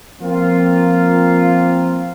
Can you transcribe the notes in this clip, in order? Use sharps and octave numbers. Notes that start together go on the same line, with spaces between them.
F3 A#3 C4 F4